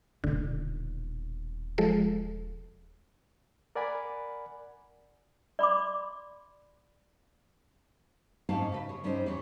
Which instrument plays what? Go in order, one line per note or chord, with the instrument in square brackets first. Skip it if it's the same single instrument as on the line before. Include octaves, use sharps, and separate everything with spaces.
[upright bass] D#1 B2 [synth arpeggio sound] D3
[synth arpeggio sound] F3 G#3 A4
[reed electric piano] A#4 D5 F#5 G#5 B5
[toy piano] D5 B5 C6 D6
[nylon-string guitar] G#2 C4 C#4 D#4 F5 A5
C#3 B4 E5
G#4 C#5
G2 G3 C#4 D#4 E4 C5
E2 C#5